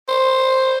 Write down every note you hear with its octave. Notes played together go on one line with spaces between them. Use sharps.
C5